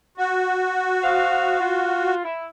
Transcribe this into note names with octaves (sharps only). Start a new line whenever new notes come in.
F#4
C5 D#5 F5
F4
E4